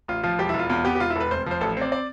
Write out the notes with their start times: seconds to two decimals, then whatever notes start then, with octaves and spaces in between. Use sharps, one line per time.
0.08 A1 F4
0.23 F3 F4
0.39 E1 G4
0.49 E4
0.54 E1 F4
0.69 E2 F4
0.85 B3 G4
0.95 G4
1.00 E1 F4
1.10 E4
1.16 E1 A4 B4
1.31 F1 C5
1.46 F3 C5
1.61 A1 A4
1.77 C4 D5
1.92 D5